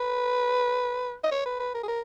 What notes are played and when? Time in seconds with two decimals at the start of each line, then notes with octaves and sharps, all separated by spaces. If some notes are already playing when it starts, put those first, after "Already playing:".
Already playing: B4
1.24 D#5
1.31 C#5
1.46 B4
1.60 B4
1.75 A#4
1.83 G#4
1.88 A#4